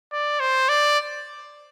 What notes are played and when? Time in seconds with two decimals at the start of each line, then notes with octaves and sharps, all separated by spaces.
0.13 D5
0.40 C5
0.69 D5